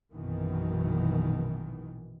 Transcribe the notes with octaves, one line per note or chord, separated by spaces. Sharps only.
A#1 F#2 B2 D#3 E3